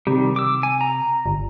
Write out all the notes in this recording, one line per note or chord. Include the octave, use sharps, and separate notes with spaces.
C3 D#3 G3
D6 E6
G#5
A#5
G1